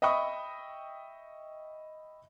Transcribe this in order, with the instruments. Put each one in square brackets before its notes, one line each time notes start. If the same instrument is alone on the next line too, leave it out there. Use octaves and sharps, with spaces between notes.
[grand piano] D#5 E5 G5 B5 C#6 D#6